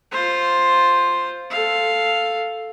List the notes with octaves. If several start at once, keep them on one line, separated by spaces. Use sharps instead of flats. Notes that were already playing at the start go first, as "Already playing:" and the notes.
F4 C5
A4 F5